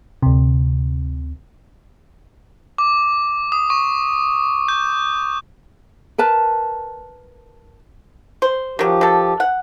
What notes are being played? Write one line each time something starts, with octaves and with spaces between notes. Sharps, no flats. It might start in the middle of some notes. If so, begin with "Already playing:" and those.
D2 C3
D6
D#6
C#6
G6
A#4 B4 A5
C5
D#3 F3 F#3 G4
D#3 A4
F#5